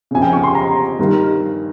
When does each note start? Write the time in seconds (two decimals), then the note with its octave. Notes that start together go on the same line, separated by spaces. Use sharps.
0.11 F2 C#3 G#5
0.22 G5
0.33 C#6
0.43 C6
0.55 A#5
0.99 G2 D#3